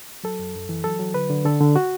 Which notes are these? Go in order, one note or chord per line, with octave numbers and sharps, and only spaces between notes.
F#3 A4
F#2
F#2
E3
F#3 A4
F#3
D3 B4
D3
D3 A4
D3
F#4